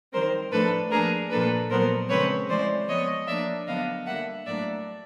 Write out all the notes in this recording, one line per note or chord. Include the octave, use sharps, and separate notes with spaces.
D#3 G3 C4 A#4 C5
A2 F3 A3 D4 A4 B4
F3 A#3 D4 G#4 A#4
A#2 F3 A#3 D4 A4 B4
A#2 F#3 B3 A#4 C5
C#3 F3 G#3 C4 B4 C#5
E3 G#3 C4 C5 D5
F3 G#3 B3 C#5 D#5
F3 A#3 D4 D5 E5
D3 F#3 B3 D4 D#5 F5
D3 G3 A#3 E5 F#5
A2 F#3 A#3 D4 D5 E5